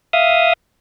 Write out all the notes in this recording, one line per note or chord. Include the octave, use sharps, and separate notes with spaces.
E5 F5 D#6